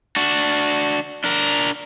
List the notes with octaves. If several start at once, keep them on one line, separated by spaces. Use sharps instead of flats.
D4 F#4
D4 A#4